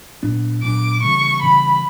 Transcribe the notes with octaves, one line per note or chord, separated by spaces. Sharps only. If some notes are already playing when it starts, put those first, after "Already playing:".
A#2 F#3 B3 D4
A#2 F#3 B3 D4 D6
C#3 E3 G3 B3 C#6
C#3 E3 G3 B3 B5